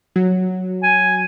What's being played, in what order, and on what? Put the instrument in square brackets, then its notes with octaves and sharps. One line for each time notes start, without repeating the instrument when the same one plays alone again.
[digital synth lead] F#3
[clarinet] G#5